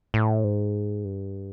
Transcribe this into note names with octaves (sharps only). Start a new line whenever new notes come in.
A2
G#2
G2